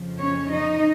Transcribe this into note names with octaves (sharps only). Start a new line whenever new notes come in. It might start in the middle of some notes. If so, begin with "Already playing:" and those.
Already playing: F2 C#3 F3
C#4 C#5
D#4 D#5